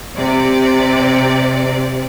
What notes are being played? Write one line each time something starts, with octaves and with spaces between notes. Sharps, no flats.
C3 D5